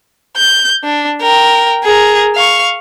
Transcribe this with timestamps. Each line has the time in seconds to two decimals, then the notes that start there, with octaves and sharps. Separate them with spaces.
0.37 G6
0.84 D4
1.21 A#4 G5
1.84 G#4 A#4
2.36 F5 C#6